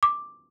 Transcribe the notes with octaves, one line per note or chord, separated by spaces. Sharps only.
D6